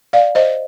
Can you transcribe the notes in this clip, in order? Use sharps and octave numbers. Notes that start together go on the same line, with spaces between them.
D5 F5
C5 D#5